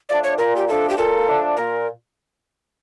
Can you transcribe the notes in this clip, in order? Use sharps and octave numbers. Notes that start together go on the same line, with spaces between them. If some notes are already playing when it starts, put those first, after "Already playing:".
F3 A3 D4 D5
C#5
A#2 A#4
G4
F3 A3 D4 A4
G4
A#2 A4
F3 A3 D4
A#2 A#4